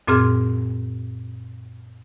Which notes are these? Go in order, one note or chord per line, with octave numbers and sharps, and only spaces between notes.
F#2 A#2 C4 G#4 F6